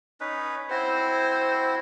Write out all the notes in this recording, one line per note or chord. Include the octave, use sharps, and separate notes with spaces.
C#4 D#4 B4
C4 E4 F#4 C5